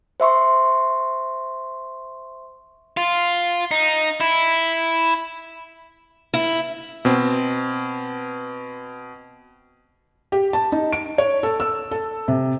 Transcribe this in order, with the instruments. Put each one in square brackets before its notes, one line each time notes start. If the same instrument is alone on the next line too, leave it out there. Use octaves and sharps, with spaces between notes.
[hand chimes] C5 E5 C6 C#6
[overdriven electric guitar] F4
D#4
E4
[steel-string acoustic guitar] E4
[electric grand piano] B2 C4
[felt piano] G4
A5
D#4
D7
C#5
A4
E6
A4
C3